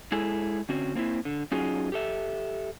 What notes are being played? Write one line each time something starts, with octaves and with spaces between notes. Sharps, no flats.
G#3 E4 G#4 A4
D3 C4 C#4 F#4
A#3 C4 D#4 E4
D3
F#3 C#4 D#4 F4 F#4 G#4
G4 A4 E5